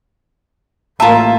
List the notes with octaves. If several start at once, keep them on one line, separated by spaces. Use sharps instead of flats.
A1 A#3 F4 E5 A5 A#5